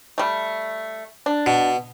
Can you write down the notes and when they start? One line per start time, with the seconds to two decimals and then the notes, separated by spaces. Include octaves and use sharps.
0.18 G3 A3
1.26 D4
1.46 B2